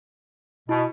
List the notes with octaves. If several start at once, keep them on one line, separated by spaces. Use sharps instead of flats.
B2 E4